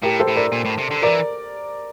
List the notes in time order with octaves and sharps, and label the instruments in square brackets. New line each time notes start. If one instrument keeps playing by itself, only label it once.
[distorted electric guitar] A2 [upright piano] G4 A#4
[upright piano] A4 C5
[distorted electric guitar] A2
[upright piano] A#4 D5
[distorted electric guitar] A#2
A2
C3
D3
[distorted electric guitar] E3 [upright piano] A#4 D5